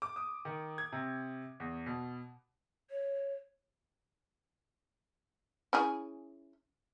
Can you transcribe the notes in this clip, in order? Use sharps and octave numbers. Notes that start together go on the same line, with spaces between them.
D6
D#6
D#3
G#6
C3
E2
B2
C#5
C#4 E4 G#4